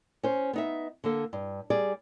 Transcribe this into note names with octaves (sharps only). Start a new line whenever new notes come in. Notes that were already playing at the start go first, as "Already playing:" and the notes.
C#4 C5
B3 D#4 E5
D3 A#3 A4
G2
G3 G#4 D5